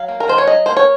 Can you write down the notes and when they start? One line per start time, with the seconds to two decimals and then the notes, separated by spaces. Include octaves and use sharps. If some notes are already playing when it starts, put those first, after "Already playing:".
Already playing: F#3 F5
0.08 A#3
0.20 A#4
0.28 D#3 C5
0.38 C#5
0.47 F#3 D#5
0.66 A#3 C5
0.77 C#5